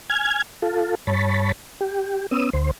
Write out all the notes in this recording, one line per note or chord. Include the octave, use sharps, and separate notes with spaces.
G#5 F6 G#6
F4 A4
G2 C#5 A5 B5
G4
B3 C#4 D#6 E6
D2 C5